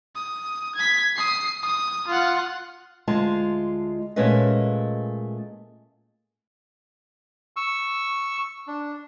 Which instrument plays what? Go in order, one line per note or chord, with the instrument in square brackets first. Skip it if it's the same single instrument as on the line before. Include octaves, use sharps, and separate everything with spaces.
[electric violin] D#6
G#6 B6
D#6 C7
D#6
F4 F#5
[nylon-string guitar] D2 G#3 F4 A5
A#2 G#3 A3 C#4 B4 D#5
[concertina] C#6 E6
D4